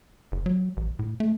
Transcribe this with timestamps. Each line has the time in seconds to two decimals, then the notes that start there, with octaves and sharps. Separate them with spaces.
0.32 F#1
0.46 F#3
0.77 A1
0.99 A2
1.20 A3